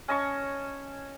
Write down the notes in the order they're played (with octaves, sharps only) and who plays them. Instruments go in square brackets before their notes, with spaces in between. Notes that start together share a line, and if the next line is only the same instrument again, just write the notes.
[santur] C#4 D#5 A5 C#6